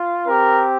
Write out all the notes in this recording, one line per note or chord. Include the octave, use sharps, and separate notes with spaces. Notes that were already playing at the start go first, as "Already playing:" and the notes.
Already playing: F4
C4 G4 A#4